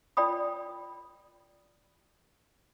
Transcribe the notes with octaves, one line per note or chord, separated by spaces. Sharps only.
F4 A#4 D5 G5 B5 D#6